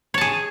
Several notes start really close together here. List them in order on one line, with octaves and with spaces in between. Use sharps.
C#5 A5 G#4